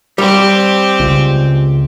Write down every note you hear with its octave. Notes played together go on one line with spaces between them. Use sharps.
G3 C4 G4
C#2